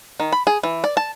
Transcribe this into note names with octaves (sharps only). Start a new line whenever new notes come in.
D#3
B5
G#4
E3
D5
A5